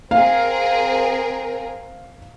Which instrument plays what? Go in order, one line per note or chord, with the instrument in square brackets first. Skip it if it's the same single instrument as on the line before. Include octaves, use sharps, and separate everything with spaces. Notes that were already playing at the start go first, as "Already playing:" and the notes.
[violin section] C4 G#4 A#4 [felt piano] F5